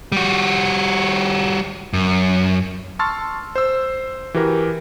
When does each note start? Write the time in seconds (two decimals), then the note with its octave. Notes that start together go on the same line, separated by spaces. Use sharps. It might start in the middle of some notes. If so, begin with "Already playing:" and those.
0.12 G3 F#4
1.93 F#2
2.99 A5 C6 C#6 E6 F6 A6
3.56 C5 E6
4.34 E3 F#4 G4 A#4